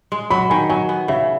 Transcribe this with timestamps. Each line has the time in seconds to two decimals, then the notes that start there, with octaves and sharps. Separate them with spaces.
0.12 G#3
0.30 F#3 B5
0.50 D#3 G#5
0.69 F#3 G#5
0.89 B3
1.08 C#3 E5